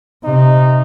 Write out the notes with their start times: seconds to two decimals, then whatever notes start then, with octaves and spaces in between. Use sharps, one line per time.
0.24 C3 D#4